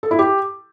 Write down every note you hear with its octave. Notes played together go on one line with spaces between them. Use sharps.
A4
E4
G4